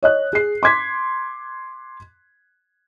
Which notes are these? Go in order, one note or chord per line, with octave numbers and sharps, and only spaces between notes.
C#5 D#5 F#6
G#4 C7
C6 D6 G#6 B6